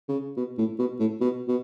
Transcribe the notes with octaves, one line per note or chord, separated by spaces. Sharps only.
C#3
B2
A2
B2
A2
B2
B2